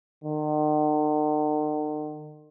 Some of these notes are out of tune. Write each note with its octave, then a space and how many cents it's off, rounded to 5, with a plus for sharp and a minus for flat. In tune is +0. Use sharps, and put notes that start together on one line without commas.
D#3 -45